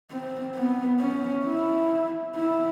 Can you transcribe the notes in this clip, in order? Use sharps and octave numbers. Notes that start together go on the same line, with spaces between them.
C4
B3
C#4
E4
E4